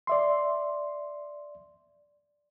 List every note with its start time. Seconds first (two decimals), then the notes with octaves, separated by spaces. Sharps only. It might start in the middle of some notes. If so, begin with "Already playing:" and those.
0.07 D5 E5 C6